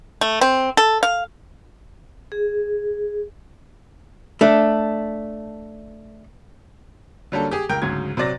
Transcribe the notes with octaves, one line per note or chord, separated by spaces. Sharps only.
A3
C4
A4
F5
G#4
A3 D4
D3 F#3 G3 A#3 C#4 A4
G4 G#4
C#2 A#4 G5 G6
D2 G#2 C#3 F#3 G#6
C3 F#3 C5 D5 A6 A#6